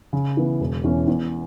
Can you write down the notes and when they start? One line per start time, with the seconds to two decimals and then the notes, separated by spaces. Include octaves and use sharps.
0.13 C#3
0.37 E3 B3
0.60 E1
0.84 E2 E3 C#4
1.08 E2